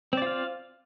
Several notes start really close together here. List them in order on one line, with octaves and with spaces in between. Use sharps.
C4 D5 F4 F5